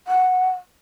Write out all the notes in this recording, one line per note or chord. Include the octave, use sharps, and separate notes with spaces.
F#5